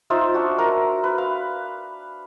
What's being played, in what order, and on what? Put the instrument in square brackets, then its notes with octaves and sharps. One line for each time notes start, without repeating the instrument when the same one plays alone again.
[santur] D#4 F4 C5 E5
D4 F#4
A#4 A#5
B4
F5